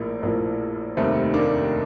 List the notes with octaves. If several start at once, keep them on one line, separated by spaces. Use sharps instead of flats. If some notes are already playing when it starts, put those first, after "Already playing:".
Already playing: A#1 A2 F3 A#3
A#1 A2 F3 A#3
F1 D#2 D#3 G3 A3 C4
A#3 D4